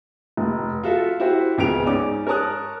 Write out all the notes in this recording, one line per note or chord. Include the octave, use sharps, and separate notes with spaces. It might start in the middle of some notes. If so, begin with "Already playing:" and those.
F1
F4 F#4 A4 E5
E4 F#4 G4 C5
C#2 C#3 B3 D7 F7
G#2 C#4 D5 D6
A#4 C#5 A5 D#6 F#6